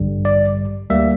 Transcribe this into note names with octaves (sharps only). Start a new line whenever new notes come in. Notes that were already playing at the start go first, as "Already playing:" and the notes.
Already playing: A1 G2 D3 G3
D5
D2 D3 G3 A#3 E5